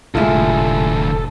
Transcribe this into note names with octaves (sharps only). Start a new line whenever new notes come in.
F1 D2 A2 F3 G#3 E4 F4 A4